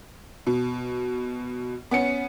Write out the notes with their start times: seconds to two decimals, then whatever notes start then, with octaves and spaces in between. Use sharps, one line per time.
0.47 B2
1.91 B3 C#4 C#7